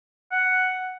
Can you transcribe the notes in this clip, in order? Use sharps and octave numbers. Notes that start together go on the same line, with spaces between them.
F#5